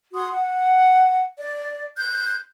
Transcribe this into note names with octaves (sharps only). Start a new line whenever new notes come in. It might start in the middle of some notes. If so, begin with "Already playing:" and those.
F#4 C6 D#6
F#5
D5
F#6 G6